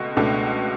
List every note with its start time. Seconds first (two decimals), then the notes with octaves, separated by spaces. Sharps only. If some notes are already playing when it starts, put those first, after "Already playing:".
Already playing: C#2 B2 A3
0.16 C#2 B2 A3 D4 A4